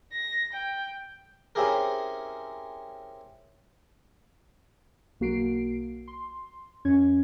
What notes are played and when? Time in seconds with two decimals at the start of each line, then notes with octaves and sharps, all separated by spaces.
0.11 A#6
0.53 G5
1.55 C4 C#4 E4 G4 G#4 A#4
5.20 B1 A#3 F#4 C7 D7
6.08 C6
6.85 F2 C#4 G#6